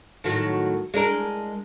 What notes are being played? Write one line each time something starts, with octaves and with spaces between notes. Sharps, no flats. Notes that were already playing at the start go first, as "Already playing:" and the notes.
A2 D#3 F#3
G#3 D4 A#4